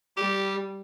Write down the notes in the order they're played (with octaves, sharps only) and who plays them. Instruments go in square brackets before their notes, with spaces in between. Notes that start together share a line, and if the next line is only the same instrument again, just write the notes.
[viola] G3 [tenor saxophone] G4